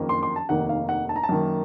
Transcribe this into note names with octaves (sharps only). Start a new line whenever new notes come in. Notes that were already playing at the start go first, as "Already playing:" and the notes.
Already playing: F#1 F2 D#3 A#3
C6
C6
A5
F1 D#2 D#3 A#3 F#5
F5
F#5
A5
A#5
A5
F#2 D#3 A#3